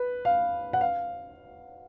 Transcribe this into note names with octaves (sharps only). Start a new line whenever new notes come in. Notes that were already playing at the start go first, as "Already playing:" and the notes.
Already playing: B4
F5
F#5
F5